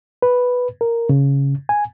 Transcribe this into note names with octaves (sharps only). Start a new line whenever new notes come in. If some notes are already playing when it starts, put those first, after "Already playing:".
B4
A#4
C#3
G#5